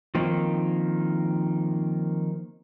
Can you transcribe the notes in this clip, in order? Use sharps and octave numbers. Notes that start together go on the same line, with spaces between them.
D#3 F3 A#3 C4 D#4